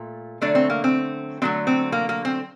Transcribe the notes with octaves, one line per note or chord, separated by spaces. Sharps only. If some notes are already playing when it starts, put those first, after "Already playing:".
Already playing: A#2 A3
D3 F#3 A3 D4
C4
A#3
C4
D3 F#3 A3 C4
C4
A#3
A#3
C4